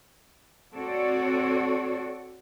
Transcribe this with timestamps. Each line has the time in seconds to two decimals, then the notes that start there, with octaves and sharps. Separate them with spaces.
0.74 C4 F#4 A4 C#5 D5